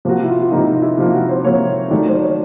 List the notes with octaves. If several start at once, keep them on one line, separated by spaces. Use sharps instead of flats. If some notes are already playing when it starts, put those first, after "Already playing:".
C3 F3 A#3 F#4
G4
E4
F4
F4
C3 F3 A#3 D#4
D#4
E4
C3 F3 A#3 F4
F#4
C5
C3 F3 A#3 C#5
D#3 F#3 A3 D5
C5
C#5